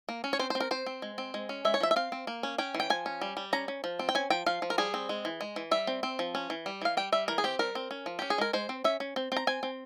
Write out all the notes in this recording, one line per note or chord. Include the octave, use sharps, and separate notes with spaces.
A#3
C#4
C#5
C4 C5
C5
C4
A#4
C4 C5
C4
G#3
C4
G#3
C#4
G#3 E5
C#5
F3 E5
E5
C4 F5
C4
A#3
C#4
C#4 G5
E3
G5
F3 G#5
C#4
G3
G3
C#4 A#5
C#4
F3
C4
G5
C#4 G#5
F3 G5
F3 F5
F3
A#4
G3 G#4
C4
G#3
E3
G#3
E3
G3 E5
C4
C4
F3
C#4
E3
G3
E3 F5
G3 G5
G3 E5
E3 A#4
G#4
C4 G4
G3 A#4
C4
C#4
F3
C#4 G4
G#4
G#3 A#4
G#3 C5
C4
C#4 E5
C#4
C4
C4 A#5
C4 G#5
C4